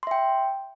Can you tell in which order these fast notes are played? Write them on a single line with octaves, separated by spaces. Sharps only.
C6 E5 G5